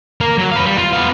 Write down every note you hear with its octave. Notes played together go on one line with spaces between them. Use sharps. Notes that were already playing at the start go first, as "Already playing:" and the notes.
A#3 A#4
F#3
B4 F5
G3
F4
B3 F5